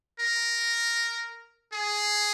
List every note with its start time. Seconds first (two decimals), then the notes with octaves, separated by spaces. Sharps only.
0.20 A#4
1.73 G#4